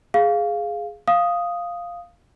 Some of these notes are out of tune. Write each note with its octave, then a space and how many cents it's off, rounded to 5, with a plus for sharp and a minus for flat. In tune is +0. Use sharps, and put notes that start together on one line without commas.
G#4 +0 F5 +0
F5 +0 D#6 +0